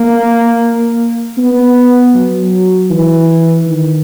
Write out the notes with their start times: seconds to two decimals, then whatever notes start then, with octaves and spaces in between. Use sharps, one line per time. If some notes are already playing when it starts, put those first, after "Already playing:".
Already playing: A#3
1.38 B3
2.14 F#3
2.90 E3
3.67 D#3